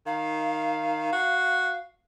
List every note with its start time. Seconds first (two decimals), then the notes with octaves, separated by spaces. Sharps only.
0.06 D#3 F5
1.13 F#4